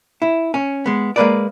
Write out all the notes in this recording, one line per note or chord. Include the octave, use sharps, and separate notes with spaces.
E4
C#4
G#3 B3
G#3 A#3 B4 D5